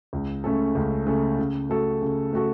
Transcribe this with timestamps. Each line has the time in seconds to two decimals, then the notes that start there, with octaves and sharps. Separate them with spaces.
0.13 C#2
0.44 C#3 A3 C#4 A4
0.75 C#2
1.06 C#3 A3 C#4 A4
1.39 C#3
1.69 A3 F#4 A4
2.02 C#3
2.33 A3 F#4 A4